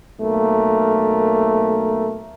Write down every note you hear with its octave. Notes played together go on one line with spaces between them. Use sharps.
B1 A3 A#3 A#4